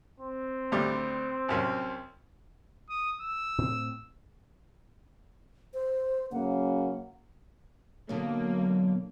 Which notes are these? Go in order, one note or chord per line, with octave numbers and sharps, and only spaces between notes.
C4
D2 G3
C2 F#2
D#6
E6
A2 C4
C5
F#2 C#3 A#3 F#5
B2 D3 F#3 A#3